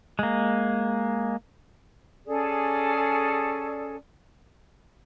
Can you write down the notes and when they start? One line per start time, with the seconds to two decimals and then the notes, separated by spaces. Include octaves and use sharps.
0.19 G#3 A#3
2.26 C#4 G#4 A4 D5